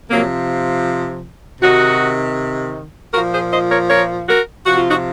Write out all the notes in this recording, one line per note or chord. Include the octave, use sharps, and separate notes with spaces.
C3 F3 F#3 A#3
C3 D#3 D#4 F#4
A#2 F3 F#4 A#4
G#4 C5
C5 D#5
A#4 C#5
A#4 C#5
F#4 A#4
C3 F3 F#4
F4
D#4 F#4